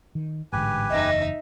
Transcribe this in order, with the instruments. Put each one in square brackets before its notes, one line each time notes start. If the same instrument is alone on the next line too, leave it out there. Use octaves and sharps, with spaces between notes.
[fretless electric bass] D#3
[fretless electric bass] A1 G#2 D3 [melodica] G4 B4 G#5
[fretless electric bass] F#1 E2 [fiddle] D#4 E5 [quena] D#5